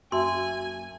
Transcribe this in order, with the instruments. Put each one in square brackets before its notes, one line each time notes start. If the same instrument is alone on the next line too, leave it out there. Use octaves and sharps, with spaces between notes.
[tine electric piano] F#2 A#3 A5 [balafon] F#4 E5 [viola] G#5 [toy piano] C6